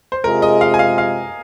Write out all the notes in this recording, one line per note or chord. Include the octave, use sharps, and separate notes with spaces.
C5
C3 G#3 F4 G#4 A#4
D#5
F5
G#5
F5
F5